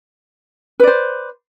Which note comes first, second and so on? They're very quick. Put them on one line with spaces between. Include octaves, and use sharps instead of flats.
B4 D5 C5